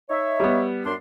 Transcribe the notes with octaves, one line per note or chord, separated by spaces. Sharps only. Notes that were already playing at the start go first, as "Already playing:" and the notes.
D#4 C#5 E5
G3 B3
F#2 D4 C6